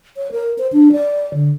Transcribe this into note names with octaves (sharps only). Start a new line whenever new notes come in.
C#5
A#4
C5
D4
D5
D3